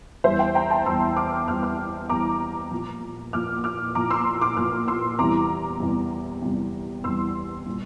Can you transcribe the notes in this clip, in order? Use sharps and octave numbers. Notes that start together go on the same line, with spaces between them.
E2 E3 G3 C5 E5
E5 G5
G5 A#5
A5 C6
E2 E3 G3 C6 E6
D6 F6
E2 E3 G3 D6 F6
D6 F6
E2 E3 G3 A#5 D6
A#2 F3
A#2 F3 D6 F6
D6 F6
A#2 F3 A#5 D6
C6 E6
D6 F6
A#2 F3 D6 F6
C6 E6
E2 C3 E3 G3 A#5 D6
E2 C3 E3 G3
E2 C3 E3 G3
E2 C3 E3 G3 C6 E6
A#2 G3